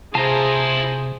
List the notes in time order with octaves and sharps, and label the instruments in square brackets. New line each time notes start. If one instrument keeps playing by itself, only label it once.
[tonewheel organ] C3 [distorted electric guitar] E4 F4 [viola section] G#4 C5 [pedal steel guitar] A5 A#5